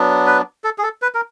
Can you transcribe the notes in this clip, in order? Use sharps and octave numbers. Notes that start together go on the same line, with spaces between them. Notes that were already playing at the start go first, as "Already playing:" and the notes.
Already playing: F#3 B3 D4
B4
A4
G#4
A4
B4
A#4